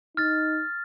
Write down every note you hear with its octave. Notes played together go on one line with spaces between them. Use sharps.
D#4 F6 A6